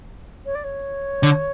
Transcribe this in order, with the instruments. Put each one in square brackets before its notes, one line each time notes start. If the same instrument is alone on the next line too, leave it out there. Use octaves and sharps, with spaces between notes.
[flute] C#5
D5
C#5
[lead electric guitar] D3